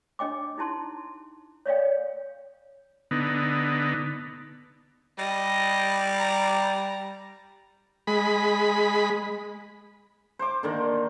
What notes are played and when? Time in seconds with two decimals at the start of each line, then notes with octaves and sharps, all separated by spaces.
0.19 D4 D#5 G5 D6
0.58 D#4 E4 A5 C6
1.66 C#5 D5 F5 G5
3.11 D3 B3 D#4
5.18 G3 D#5
6.18 A#5
8.07 G#3 B5
10.39 C5 D6
10.63 D3 D#3 A#3